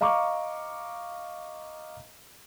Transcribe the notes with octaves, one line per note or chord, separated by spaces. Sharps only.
D#5 F5 A#5 C#6 D6